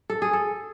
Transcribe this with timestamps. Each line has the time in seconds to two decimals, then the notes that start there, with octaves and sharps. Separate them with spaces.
0.10 A4
0.22 G#4
0.33 A4